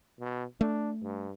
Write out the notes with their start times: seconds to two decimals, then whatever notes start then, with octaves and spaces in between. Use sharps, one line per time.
0.20 B2
0.61 A3 D4
1.03 G2